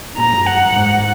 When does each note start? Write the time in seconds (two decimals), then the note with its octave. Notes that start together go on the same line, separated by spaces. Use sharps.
0.17 A#2 A#5
0.32 F#2
0.46 F#2 F#5
0.65 F#2
0.75 G#2